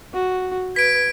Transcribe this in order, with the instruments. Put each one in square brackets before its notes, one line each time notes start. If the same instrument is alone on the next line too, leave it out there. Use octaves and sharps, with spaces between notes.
[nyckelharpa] F#4
[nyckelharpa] B4 [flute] G#6 [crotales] B6 D7